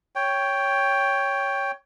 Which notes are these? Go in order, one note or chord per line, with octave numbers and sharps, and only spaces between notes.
C#5 G5